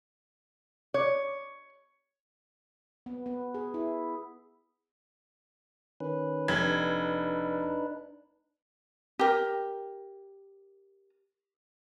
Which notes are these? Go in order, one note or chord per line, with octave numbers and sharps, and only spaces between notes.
C#5
B3
B3
G#4
E4
D#3 C#4 B4
F1 G#6
D4 D#4 B4
G4 A#4